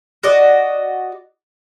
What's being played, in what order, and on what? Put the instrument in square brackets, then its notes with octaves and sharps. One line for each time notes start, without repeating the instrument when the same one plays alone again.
[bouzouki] F#4 D5 D#5